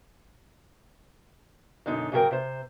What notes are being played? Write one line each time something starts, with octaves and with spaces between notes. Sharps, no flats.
F#2 B2 D3 D#4
G#2 C#3 F#3 G#4 A#4 G5
C3 C5